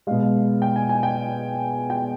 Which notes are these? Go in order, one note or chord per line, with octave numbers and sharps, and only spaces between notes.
B2 G#3 F5
G5
G#5
G#5
G5
G5